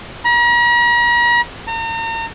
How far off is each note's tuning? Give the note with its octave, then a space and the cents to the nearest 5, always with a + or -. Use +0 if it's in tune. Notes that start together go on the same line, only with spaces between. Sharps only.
A#5 +45
A#5 -40